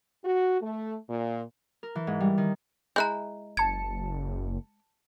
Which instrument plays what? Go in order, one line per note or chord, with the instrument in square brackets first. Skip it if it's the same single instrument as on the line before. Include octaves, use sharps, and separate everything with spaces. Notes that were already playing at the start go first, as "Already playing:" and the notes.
[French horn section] F#4
A3
A#2
[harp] A#4
E3
G#2
G3
D#3
[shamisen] G#3 E4 [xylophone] A#5 F#6 G6
[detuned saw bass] F#1 [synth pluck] A5 C#7 [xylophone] G#6